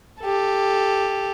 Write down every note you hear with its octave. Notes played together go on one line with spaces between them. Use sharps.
G4 A4